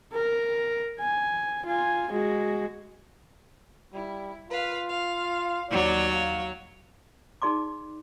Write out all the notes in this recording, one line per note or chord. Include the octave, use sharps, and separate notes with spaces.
A#4
G#5
F4 G#5
G#3 F#4
G3 E4
F4 B4 F5
F5
D#2 F#3 C#5 D5
F5
D#4 G#4 D5 C6 D6